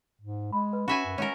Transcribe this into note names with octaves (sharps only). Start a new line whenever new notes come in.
G#2
G#3 B5
B4
C#4 F#4 E5 G#5 B5
F#2
G#3 C#4 F#4 A#4 C#5